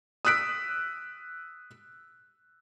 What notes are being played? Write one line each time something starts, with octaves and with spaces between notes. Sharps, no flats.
D#6 E6 F#6 B6 D7